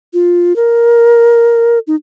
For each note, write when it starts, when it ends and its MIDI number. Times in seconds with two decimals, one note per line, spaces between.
0.14 0.56 65
0.56 1.79 70
1.87 1.95 63